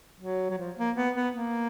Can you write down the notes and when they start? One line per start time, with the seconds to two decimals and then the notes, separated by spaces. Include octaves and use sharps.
0.20 F#3
0.50 F#3
0.58 F3
0.77 A#3
0.96 B3
1.16 B3
1.34 A#3